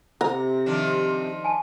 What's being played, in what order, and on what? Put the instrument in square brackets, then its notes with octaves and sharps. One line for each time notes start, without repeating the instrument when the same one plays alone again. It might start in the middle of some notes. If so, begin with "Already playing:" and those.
[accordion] C3 [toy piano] C5 [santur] A#5
[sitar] D#3 F3 D4
[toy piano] G#5 A5